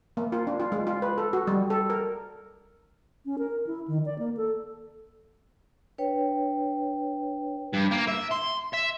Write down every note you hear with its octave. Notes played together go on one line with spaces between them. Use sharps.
A#3
F4
D4
F4
G#3
F4
B4
A4
F#4
G3
A4
A#4
C#4
A#4
E4
D#3
D5
A#3
A4
D4 B4 C#5 G5
G2
A#3
E5
C6
E5